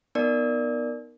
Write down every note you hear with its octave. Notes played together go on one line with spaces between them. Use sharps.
B3 D#4 A#4 D5